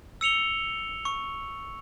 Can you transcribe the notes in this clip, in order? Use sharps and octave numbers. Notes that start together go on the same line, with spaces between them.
E6 C#7 F7 G7
C#6